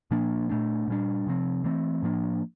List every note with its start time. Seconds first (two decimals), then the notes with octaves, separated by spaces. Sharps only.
0.11 A#2 F3 A#3 D4
0.49 A#2 A3 D4
0.88 A#2 G3 D4
1.27 C3 F3 C4
1.64 E3 A3 C4
2.03 A2 F3 A#3 D4